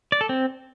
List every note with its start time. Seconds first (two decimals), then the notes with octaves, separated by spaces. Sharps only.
0.12 D5
0.21 A4
0.29 C4